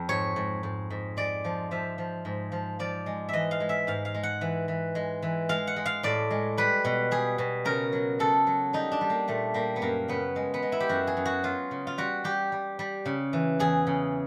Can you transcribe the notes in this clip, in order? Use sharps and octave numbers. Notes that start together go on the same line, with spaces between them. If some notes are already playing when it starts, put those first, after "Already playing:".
Already playing: F2
G#2 C#5
G#2
G#2
G#2
G#3 D5
F3
F3 E5
F3
G#2
F3
F3 D5
G#3
E3 D#5 E5
F5
G#3
E5
G#2 F5
F5
G#3
F#5
E3
E3
G#3
E3
G#3 F5
F#5
G#3
F5
A2 D5
G#3
G3 B4
B2
G3 G#4
B2
C#3 A#4
F#3
C#3 A4
F#3
G3 D#4
D4
G3
A#3
A#2 A3
G3 A#3
B3
F#2 A#3
C#3 B3
G#3
B3
G#3
E4
G4
F#2 F#4
G#4
F#2
F#4
F#3 F4
C#3
F4
G3 F#4
G3 G4
G3
G3
C#3
E3
E2 G#4
C#3